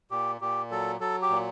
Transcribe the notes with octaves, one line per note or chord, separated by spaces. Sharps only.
A#2 G4
A#2 G4
F#3 A4
F#3 A4
G4
A#2